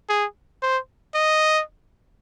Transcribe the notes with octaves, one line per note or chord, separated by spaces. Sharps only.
G#4
C5
D#5